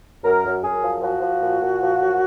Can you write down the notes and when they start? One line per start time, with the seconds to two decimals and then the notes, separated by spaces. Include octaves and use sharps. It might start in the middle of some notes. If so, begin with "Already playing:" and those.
0.24 F#2 A#4
0.44 F#2
0.64 F#2 G#4
0.83 F3
1.03 F3 F#4
1.22 F3
1.42 A#2
1.61 A#2
1.81 F3
2.01 F#2